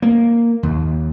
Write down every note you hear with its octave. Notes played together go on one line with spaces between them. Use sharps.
A#3
D#2